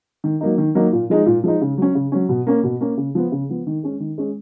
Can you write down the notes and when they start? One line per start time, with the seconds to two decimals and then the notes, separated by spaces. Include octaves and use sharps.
0.24 D#3
0.41 F#3 A#3 D#4
0.58 D#3
0.75 F#3 A#3 D#4
0.93 A#2
1.10 F3 G#3 D#4
1.26 A#2
1.44 F3 G#3 D#4
1.61 C#3
1.78 F#3 C#4
1.95 C#3
2.12 F#3 C#4
2.29 B2
2.47 A#3 C#4
2.63 B2
2.81 A#3 C#4
2.97 C#3
3.15 F3 B3
3.32 C#3
3.49 F3 B3
3.67 D#3
3.83 G#3 C#4
4.00 D#3
4.18 G#3 C#4